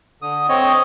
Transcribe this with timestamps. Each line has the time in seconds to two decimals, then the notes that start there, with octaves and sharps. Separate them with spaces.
0.22 D3 D#6
0.49 C4 C#5 D#5